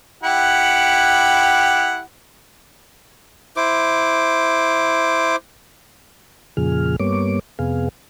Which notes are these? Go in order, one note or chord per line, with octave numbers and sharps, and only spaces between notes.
E4 G4 F#5
E4 C5 D6
F2 A#2 C#3 F3 G#4 F6
G2 G3 A#3 B3 C#5 D6
F2 C3 B3 G#4 F5